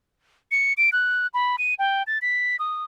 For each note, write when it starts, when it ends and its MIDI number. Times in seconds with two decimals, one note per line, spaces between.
0.51 0.73 97
0.77 0.90 98
0.92 1.27 90
1.34 1.56 83
1.58 1.74 99
1.79 2.03 79
2.07 2.18 93
2.22 2.56 95
2.59 2.84 87